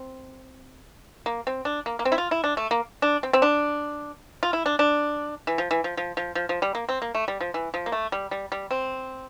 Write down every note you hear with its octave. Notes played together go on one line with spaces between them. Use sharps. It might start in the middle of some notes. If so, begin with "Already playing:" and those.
Already playing: C4
A#3
C4
D4
A#3
A#3
C4
E4
F4
E4
D4
A3
A#3
D4
C4
C4
D4
F4
E4
D4
D4
E3
F3
E3
F3
F3
F3
F3
F3
G3
A#3
C4
A#3
A3
G3
F3
E3
F3
A#3
A3
G3
G3
G3
C4